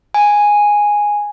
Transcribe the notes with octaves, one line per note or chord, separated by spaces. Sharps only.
G#5